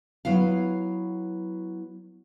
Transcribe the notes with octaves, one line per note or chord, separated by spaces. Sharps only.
F#3 B3 E4 F5